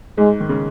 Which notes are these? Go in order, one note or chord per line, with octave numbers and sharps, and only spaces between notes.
G#2 G#3
D#3
C#3